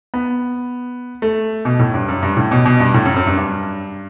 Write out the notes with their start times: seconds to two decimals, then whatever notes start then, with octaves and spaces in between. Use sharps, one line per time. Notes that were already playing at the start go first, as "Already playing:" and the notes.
0.14 B3
1.22 A3
1.65 B2
1.79 A2
1.94 G2
2.08 F#2
2.23 G2
2.37 A2
2.51 B2
2.66 B2
2.80 G2
2.94 A2
3.05 F#2
3.16 F#2
3.27 G2
3.37 G2